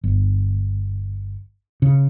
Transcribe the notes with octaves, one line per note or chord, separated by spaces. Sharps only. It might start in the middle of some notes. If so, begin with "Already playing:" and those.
G1
C#3